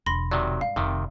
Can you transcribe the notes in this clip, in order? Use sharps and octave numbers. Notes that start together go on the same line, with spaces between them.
E1 D3 B5 C6 A#6
C3 D#3 F#3 D5
G2 G#3 F5
F1 C3 D#3